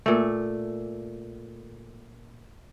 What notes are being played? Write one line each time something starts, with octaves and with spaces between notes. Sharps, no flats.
A#2 A3